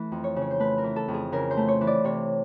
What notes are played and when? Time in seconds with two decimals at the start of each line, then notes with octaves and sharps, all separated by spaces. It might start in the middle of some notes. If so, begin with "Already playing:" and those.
Already playing: E3 A3
0.12 F2
0.24 C#5
0.36 C#3
0.41 C#5
0.50 C5
0.60 A3 B4
0.78 A#4
0.84 E3
0.96 A4
1.08 F2
1.14 G#4
1.32 C#3 A#4
1.51 C5
1.57 A3
1.68 C#5
1.81 E3
1.87 D5
2.04 C3 C#5